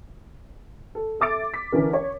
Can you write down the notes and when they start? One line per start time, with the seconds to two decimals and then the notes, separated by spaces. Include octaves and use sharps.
0.95 A4
1.20 A4 E5 D6 A6 D7
1.54 B6
1.72 D3 E3 C#4 A#4
1.93 C#5